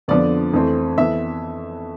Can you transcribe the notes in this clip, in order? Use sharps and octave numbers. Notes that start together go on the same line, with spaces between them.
F2 D3 F3 B3 D5
F2 E3 A3 C4
F2 E3 B3 E5